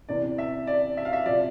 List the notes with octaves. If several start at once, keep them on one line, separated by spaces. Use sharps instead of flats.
E2 C3 E3 D5
E5
D5
E5
F5
E5
C3 F3 D5